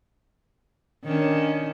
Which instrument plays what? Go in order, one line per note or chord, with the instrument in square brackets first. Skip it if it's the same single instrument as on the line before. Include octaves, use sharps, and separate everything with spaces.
[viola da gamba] D#3 C#4 D4